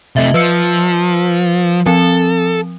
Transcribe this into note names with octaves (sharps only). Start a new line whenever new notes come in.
C3 A3 D#5 E5
F3 B4 E6 C#7
F3 C4 A4